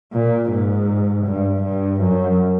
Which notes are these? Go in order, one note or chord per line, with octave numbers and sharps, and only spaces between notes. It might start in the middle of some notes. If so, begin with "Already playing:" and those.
A#2
G#2
G2
G2
F#2